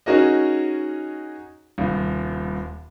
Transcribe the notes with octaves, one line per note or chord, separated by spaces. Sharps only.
C#4 D#4 F#4 G#4 A#4 D#5
D#1 C2